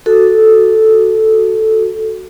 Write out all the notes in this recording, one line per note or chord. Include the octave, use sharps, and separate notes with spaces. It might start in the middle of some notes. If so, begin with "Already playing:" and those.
F#4 A4